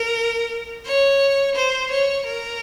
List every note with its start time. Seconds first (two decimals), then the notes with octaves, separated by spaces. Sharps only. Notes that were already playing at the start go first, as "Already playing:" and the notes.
Already playing: A#4
0.86 C#5
1.55 C5
1.91 C#5
2.26 A#4